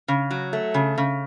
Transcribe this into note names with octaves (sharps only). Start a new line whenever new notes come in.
C#3
F#3
A3
C#3
C#3